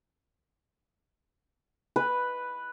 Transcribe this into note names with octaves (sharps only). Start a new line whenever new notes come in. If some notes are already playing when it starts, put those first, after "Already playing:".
B4